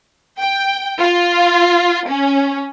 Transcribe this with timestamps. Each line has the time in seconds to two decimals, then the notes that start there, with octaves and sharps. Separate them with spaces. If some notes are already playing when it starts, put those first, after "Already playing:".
0.39 G5
1.00 F4
2.09 C#4